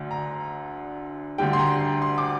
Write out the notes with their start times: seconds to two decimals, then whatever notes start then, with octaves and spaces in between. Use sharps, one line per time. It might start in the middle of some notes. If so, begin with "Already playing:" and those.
Already playing: D2 D3
0.11 A#5
1.38 D2 D3 G3 G5
1.53 C6
1.59 A#5
1.80 C6
2.02 C6
2.18 D6